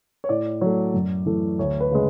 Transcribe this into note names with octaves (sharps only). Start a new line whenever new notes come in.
C#5
A2 D5
F#3 A3
F#2
E3 A3
D2 C#5
B4
C#3 G#3